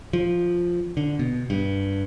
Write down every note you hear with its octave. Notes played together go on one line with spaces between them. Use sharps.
F3
D3
B2
G2